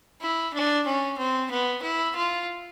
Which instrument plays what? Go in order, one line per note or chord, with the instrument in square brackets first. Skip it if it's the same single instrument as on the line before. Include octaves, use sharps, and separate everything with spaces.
[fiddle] E4
D4
C#4
C4
B3
E4
F4